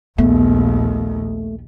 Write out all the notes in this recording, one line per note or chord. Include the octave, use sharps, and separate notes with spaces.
A#1 D#2 A3 B3